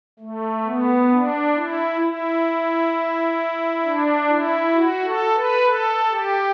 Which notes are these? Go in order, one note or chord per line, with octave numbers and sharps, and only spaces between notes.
A3
B3
D4
E4
E4
D4
E4
F#4
A4
B4
A4
G4